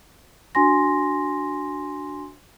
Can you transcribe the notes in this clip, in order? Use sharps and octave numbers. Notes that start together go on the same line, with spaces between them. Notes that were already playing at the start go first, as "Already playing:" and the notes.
D4 F#4 G#5 C6 A#6